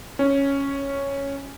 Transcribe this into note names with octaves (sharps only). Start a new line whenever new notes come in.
C#4